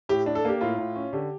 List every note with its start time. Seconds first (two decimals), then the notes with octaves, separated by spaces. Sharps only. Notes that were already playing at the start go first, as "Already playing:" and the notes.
0.09 A2 G4
0.26 D4
0.35 A4
0.45 A#3 G4
0.61 A2 F4
0.78 A2
0.95 C#4
1.13 D3 G4